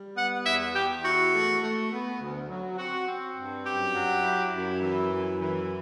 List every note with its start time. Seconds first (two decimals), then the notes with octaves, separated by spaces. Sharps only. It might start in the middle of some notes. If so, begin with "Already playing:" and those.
Already playing: G3
0.16 B3 F#5
0.45 E2 E5
0.74 E2 G4
1.03 E4 F#4
1.33 A3
1.61 A3
1.91 B3
2.20 D2
2.49 F#3
2.78 C4 F#4
3.07 C4
3.36 G2
3.65 F#2 G4
3.94 F#3
4.23 E4
4.52 F#2
4.81 E3
5.10 F#2
5.39 E3